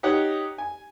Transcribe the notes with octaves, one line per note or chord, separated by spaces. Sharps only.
D#4 G4 C#5 F#5
G#5